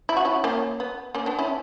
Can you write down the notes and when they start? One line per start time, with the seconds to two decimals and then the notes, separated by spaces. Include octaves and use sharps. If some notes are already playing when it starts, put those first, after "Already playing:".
0.09 E4
0.17 F#4
0.25 C#4 E4
0.44 A#3 C#4
0.80 B3
1.15 A#3 C#4
1.26 B3 D4
1.39 C#4 E4